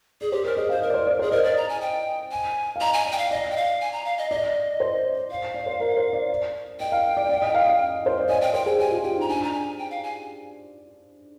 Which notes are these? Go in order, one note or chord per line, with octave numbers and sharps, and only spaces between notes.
G#4 D5
G4 C5
A#4 C5
G#4 D#5
C5 F5
A#4 D#5
D5
C5
D5
G#4 C5
A#4 D#5
D5
A#5
G#5
G5
G#5
F5
D#5 A#5
G#5
D5
G5
F5
D5 D#5
G5
F5
G#5
A#5
F5
D#5
D5 D#5
C5
F5
D5
C5
A#4
C5
D5
D#5 G5
F5
D5
D5
D#5
F5
F5
C5
D5
D#5 G#5
D5 G5
C5 G5
G#4 G5
G4 G#5
F4
G4 G5
D#4
A#5
D4 G#5
A#5
G#5
G5
F5
G#5